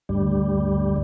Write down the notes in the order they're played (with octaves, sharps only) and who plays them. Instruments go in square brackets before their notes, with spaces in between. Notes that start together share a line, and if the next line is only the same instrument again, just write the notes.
[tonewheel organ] D2 G2 G3